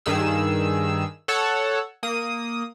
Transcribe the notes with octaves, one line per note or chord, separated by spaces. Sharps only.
G2 D#3 G#4 E6
A4 C#5 F#5 E6
A#3 D#6